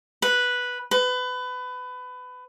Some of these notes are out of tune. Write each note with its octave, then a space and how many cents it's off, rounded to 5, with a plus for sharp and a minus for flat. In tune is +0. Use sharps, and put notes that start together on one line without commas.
B4 -5
B4 +25